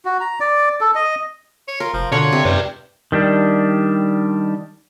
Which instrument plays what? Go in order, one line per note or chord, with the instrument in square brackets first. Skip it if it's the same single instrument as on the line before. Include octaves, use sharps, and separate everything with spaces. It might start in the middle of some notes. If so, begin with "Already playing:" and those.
[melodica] F#4
A#5
D5
A4
D#5
[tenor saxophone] C#5
[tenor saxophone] F4 [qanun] A#4
[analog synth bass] F1 [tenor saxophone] F3
[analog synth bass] B2 [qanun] D3 F#5 [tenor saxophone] F4 [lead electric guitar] C#5
[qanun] C3 [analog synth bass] C4
[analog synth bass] F#2 [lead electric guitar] B4 D5
[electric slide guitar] D#3 G3 D4